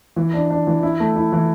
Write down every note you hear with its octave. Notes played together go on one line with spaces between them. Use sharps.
E3
D4
D4
E3
E4
A3
E4
E3